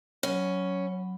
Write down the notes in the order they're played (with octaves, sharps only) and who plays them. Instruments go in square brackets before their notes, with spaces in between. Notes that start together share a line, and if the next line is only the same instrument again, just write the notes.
[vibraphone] F#3 B5 [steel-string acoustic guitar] C#4